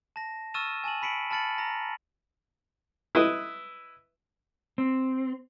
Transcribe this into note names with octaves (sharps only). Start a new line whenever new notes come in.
A5 A#6
C#6 E6 F6 A6 D#7 E7
G#5 A5 D#7 F#7
B5 B6 C#7 D7 F#7
A5 B5 F6 A6 C#7 F#7
A#5 A#6
E4 B4 D#5
C4